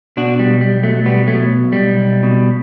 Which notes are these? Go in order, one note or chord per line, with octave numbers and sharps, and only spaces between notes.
B2 D4 F#4
G3
B1
G3
B1
F#3 A3
B2 G3 B3
F#3 A3
B2
B1
G3
B1
B2